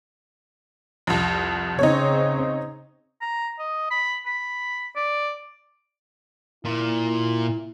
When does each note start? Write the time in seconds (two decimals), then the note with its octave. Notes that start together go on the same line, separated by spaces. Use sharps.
1.07 C2 F2
1.79 C#3 C4 D#4 C#5
3.22 A#5
3.59 D#5
3.91 B5
4.26 B5
4.96 D5
6.65 A#2 E4